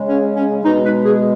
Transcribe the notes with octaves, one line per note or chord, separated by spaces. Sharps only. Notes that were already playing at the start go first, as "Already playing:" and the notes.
Already playing: C#3 G#3
C#4
C#4
B2 G#3 D#4
B4
G#4